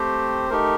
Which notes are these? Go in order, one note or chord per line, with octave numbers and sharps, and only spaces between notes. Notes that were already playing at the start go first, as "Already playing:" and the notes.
Already playing: A3 C4 G4 C5
A3 D#4 G4 A#4